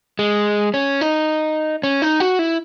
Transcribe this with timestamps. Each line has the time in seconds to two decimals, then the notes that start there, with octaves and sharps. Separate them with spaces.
0.19 G#3
0.74 C#4
1.01 D#4
1.83 C#4
2.02 D#4
2.20 F#4
2.39 E4